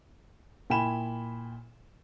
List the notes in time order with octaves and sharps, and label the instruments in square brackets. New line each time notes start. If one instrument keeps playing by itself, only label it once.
[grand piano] A#2 E4 G5 G#5 B5 E7